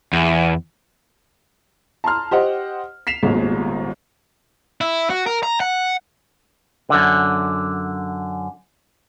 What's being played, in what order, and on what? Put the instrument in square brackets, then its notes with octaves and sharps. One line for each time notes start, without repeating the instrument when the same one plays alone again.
[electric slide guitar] E2
[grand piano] A5 A#5 C6 F6
G4 C5 D#5 F#5
B6 C7 E7 F7
D#1 G#1 D#2 G#2 B2
[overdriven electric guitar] E4
F#4
A#4
A#5
F#5
[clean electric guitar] F#2 D3